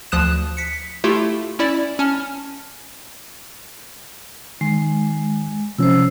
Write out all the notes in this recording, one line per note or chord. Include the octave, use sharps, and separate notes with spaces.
D2 F3 D#6 F#6 E7
B6 C#7
A3 E4 F4 G4
C#4 E4 D5
C#4 A5 F6
D#3 G#3
C3 F3 C#4 C5 E6